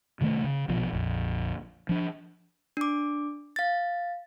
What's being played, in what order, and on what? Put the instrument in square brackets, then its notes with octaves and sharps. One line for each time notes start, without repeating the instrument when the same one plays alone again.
[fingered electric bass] C3 D#3 F3 A3
C#3
A#1 B2 F3
A#1 F2
F3 D4
[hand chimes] D4 D6
F5 A6